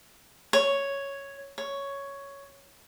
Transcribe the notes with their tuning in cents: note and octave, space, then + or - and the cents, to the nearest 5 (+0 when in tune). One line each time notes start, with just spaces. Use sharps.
C#5 +0
C#5 +5